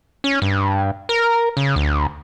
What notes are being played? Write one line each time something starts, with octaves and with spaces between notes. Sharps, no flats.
C#4
G2
A#4
C#3
D2